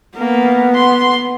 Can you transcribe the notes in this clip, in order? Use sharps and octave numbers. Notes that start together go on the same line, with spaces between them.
A#3 B3
C6